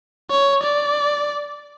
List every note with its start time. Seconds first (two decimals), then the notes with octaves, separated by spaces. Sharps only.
0.31 C#5
0.64 D5